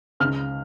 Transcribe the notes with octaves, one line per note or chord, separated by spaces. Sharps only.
C#2 F6